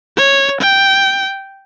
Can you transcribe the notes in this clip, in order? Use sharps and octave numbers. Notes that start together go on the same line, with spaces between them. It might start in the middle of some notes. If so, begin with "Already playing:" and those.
C#5
G5